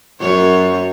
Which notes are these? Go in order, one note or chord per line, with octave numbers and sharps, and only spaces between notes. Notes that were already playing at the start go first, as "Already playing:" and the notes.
F#2 C#5